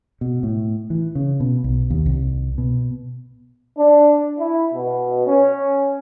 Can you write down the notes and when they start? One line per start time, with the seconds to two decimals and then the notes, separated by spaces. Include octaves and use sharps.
0.21 B2
0.43 A2
0.90 E3
1.15 C#3
1.40 B2
1.64 B1
1.90 D#2
2.06 C2
2.58 B2
3.78 D4
4.39 E4
4.74 B2
5.27 C#4